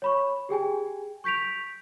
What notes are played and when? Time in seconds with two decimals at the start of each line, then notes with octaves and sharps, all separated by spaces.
0.02 C#5 B5 C#6
0.49 G4 G#4 G5 G#5
1.24 C#6 G6 B6 D7 F7